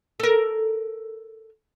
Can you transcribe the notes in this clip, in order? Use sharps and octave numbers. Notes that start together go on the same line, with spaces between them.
A4 A#4